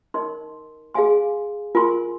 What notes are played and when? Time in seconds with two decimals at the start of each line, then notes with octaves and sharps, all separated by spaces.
0.14 D#4 A#4 D#5 C6
0.94 G#4 F5 G#5 C6
1.75 F4 A#4 G#5 C6